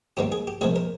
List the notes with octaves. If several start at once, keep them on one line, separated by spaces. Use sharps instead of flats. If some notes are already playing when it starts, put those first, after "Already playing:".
G#2 D#3 G3 A#3 G4
G#4
G4
C2 A#2 F3 G#3 G#4
A#4